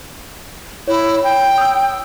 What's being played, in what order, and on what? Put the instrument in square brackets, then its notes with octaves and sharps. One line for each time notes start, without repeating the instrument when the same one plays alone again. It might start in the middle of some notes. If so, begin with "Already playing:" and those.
[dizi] E4 [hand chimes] C#5
[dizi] G5
[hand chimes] D#6 E6